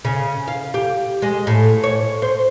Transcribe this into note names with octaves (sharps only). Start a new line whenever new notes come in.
C#3
F5
G4
G#3
A2
C#5
C5